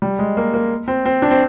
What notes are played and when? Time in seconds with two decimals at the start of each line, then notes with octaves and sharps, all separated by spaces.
0.02 G3
0.19 G#3
0.37 A#3
0.54 A#3
0.88 C4
1.05 C4
1.22 D4
1.31 C4